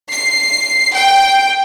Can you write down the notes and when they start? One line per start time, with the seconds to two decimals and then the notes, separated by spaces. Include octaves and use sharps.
0.12 C7
0.94 G5